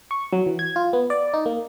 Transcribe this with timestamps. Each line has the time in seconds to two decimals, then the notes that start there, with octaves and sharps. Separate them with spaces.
0.11 C#6
0.33 F#3
0.46 E3
0.59 G#6
0.76 F4
0.93 B3
1.10 D5
1.34 D#4
1.46 A#3